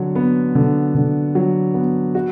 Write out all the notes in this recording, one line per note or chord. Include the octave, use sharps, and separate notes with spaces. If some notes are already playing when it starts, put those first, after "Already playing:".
Already playing: D3 F#3
B3
D3
D3
F#3
B3
F#4